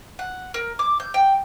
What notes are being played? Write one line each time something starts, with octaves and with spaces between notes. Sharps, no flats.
F#5
A#4
D6
G6
G5